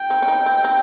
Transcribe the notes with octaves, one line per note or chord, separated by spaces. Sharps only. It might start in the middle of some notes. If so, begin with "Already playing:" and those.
Already playing: G5
C4 D#4
C#4
C4 D#4
C4
C4 D#4